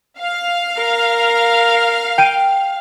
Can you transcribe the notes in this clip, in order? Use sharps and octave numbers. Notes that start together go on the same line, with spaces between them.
F5
A#4
G5 D7 D#7